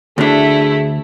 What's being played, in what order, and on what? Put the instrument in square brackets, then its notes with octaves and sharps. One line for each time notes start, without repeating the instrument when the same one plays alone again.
[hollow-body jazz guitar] D2 D4 [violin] A3 E4 [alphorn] G#4